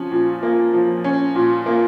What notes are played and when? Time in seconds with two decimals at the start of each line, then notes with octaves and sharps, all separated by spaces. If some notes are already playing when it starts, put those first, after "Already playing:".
Already playing: F3 C#4
0.12 A#2
0.43 A#3
0.74 F3
1.04 C#4
1.35 A#2
1.66 A#3